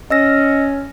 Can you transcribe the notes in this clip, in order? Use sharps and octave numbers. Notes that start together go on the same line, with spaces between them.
C#4 D#5 E6 A#6